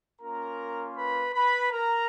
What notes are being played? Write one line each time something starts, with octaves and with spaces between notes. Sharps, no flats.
A#3 C#4 F4 A#4 A#5
B4 B5
B4 B5
A#4 A#5